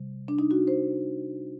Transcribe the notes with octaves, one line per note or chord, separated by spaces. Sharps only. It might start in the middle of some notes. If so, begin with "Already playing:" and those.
Already playing: C3 G3
D4
D#4
F#4
C5